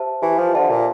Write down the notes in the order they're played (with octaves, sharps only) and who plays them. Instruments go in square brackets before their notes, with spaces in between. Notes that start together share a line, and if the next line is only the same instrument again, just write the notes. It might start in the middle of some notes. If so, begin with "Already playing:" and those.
Already playing: [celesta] G4 C5 E5 A5
[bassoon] E3 [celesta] G4
[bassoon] F3
[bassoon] D3 [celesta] C5 E5 A5
[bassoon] A#2